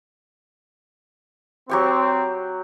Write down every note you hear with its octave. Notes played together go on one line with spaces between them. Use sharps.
F#3 C4 G4 C#6